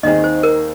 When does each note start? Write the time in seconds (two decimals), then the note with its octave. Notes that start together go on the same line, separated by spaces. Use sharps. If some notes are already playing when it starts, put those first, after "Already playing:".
0.03 D#2 D#3 C4 D#4 G#4 D#5
0.24 C5
0.43 A#4